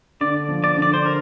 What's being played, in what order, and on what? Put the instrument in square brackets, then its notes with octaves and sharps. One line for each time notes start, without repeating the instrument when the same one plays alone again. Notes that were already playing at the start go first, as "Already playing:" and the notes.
[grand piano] D3 [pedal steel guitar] D5
[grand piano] F3
[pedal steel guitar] D5
[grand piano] D3
[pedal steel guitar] D5
C5
A#4